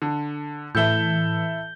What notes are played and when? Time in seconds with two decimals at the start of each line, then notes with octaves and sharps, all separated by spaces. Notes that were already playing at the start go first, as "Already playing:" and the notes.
0.02 D3
0.75 A2 E3 E4 A4 E5 G6 G7